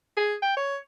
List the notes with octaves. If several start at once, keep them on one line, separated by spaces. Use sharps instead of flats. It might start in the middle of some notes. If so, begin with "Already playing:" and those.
G#4
G5
C#5